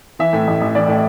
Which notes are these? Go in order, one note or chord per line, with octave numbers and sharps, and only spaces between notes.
E3 E5
A2
A1
A1
E3 D5
A2